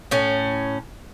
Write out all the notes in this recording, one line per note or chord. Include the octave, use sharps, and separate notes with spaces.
A2 C#4